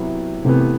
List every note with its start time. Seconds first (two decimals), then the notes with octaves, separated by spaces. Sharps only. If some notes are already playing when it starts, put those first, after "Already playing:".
Already playing: C3 F#3 B3 E4
0.45 A2 C3 E3 B3